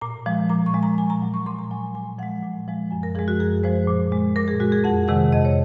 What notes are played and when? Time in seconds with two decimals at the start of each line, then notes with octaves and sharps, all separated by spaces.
0.01 A#2 A#5
0.26 F3 G#3
0.49 A#2 A#5
0.66 C#6
0.74 F3 G#3
0.83 A#5
0.98 A#2 G#5
1.10 A#5
1.22 F#3
1.34 C#6
1.46 A#2 C6
1.59 A#5
1.71 F#3 G#5
1.83 G#5
1.94 A#2 G#5
2.19 F3 G#3 F#5
2.43 A#2
2.68 F3 G#3
2.91 F#2 G#5
3.03 A#4
3.15 F3 G#3 G#4
3.28 F#4
3.40 F#2 G#4
3.63 F3 G#3 C5
3.88 A#2
4.12 G#3
4.36 A#2 A#4
4.48 G#4
4.60 G#3 F#4
4.72 G#4
4.84 F2 F#5
5.08 C3 D#3 G#3 F#5
5.32 F2 D#5
5.45 C#5